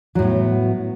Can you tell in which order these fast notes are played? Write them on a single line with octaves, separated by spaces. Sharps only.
F#3 A2 B3